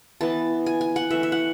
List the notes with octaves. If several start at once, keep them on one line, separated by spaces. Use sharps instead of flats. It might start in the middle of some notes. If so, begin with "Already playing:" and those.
E3 B3 A5
G#5
G#5
F#5
E3 A3 E5
E5
F#5